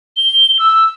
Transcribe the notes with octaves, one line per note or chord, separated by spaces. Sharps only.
G7
E6